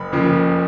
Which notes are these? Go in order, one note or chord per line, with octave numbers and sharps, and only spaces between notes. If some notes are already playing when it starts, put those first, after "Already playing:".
Already playing: F#1 B5
F2 C#3 F3 A#3